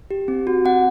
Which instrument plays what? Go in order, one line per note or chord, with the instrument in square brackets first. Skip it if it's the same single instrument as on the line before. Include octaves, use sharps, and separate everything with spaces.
[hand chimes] G4
C4
F#4
C4 F#5